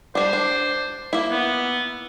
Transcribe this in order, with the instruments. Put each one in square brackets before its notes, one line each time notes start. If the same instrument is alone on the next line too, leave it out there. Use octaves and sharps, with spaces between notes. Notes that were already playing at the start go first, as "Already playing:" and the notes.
[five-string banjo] G3 D4 [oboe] C5
[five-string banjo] D4
A#3 E4
[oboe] B3